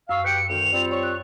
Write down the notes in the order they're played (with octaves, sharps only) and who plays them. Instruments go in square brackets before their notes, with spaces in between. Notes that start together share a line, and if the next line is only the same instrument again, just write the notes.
[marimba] F#2 C#6 [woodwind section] F5 [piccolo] E6
[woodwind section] G4 B4 G5 [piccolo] C#7
[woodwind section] D2 D#3 [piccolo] F7
[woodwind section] G3 C4 F4
[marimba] C#5 [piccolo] C#6
[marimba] F#6